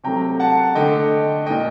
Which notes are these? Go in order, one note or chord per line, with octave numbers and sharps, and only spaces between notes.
C3 F#3 A3 G5 A#5
F#5 A5
D3 A3 D#5 G5
A#2 A3 D#5 G5